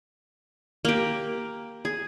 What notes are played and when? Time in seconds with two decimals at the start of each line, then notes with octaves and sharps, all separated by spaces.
0.85 A#3 G4
1.85 G#4